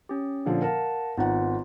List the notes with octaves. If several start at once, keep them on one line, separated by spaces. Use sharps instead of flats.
C#4 G4
A#2 D3 F3
A#4 F5 F#5 A5
G#1 B3 D#4 F4 F#5